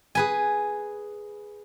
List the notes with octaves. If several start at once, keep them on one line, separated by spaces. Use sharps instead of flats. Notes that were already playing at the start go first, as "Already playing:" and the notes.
G#4 B4 G#5